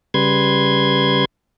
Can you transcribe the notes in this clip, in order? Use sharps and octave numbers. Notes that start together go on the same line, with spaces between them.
C#3 G3 B4 C6 G#6